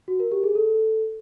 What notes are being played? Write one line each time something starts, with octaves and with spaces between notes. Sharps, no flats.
F#4
A#4
G4
G#4
A4